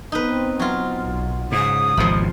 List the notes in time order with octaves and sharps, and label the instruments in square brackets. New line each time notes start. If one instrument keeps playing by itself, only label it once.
[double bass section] B3 C4 [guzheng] D#4 B4
[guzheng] F#3 F4
[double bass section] B1
[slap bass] G#2 [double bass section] C#3 [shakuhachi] D#6
[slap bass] G#1 D#2 B2 [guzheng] F3 B5